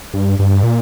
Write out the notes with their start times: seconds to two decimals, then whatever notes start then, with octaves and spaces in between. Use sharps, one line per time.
0.14 G2
0.39 G2
0.63 A#2